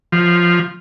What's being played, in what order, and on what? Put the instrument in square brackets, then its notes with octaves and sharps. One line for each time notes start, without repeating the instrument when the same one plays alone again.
[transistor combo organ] F3